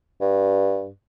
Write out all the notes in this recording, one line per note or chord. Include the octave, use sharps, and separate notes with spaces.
G2